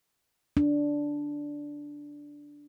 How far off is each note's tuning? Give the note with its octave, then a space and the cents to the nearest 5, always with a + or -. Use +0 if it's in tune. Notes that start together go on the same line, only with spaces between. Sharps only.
D4 -5